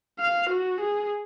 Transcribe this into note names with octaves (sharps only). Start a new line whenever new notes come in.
F5
F#4
G#4